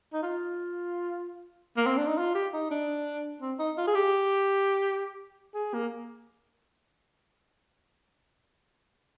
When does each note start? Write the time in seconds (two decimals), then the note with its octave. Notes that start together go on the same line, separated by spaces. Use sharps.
0.13 D#4
0.23 F4
1.77 A#3
1.86 C4
1.97 D4
2.07 D#4
2.18 F4
2.35 G4
2.54 D#4
2.71 D4
3.41 C4
3.59 D#4
3.77 F4
3.87 G#4
3.95 G4
5.55 G#4
5.74 A#3